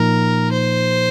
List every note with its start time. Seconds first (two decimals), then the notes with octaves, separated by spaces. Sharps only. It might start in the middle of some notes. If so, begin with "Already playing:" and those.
Already playing: A#2 F3 A#3 D#4 A#4
0.52 C5